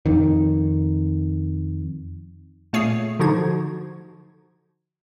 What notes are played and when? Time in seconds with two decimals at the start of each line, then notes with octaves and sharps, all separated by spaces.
0.06 F2 D#3
2.73 A#2 A3 G#4 C#5 C7
3.19 D3 F3 D#4 F#4 G#6